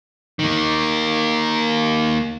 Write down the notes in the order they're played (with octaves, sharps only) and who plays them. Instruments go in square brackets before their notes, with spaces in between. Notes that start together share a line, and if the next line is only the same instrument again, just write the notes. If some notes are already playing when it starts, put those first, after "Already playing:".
[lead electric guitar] D#3 A#3